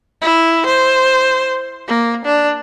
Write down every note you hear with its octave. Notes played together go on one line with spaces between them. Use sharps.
E4
C5
A#3
D4